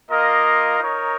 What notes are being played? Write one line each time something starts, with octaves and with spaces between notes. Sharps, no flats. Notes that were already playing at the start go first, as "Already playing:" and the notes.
A#3 F4 A#4 D#5
D#4 A#4 C#5